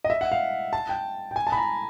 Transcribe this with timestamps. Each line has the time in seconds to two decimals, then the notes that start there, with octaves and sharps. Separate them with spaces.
0.04 D#5
0.10 E5
0.21 F#5
0.32 F5
0.73 A5
0.89 G5
1.31 G5
1.36 G#5
1.47 A5
1.52 B5
1.58 A#5